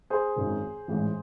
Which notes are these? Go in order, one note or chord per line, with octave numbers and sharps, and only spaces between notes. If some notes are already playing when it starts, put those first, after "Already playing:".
G#4 C5
G#1 F#2 D#3
A1 G#2 E3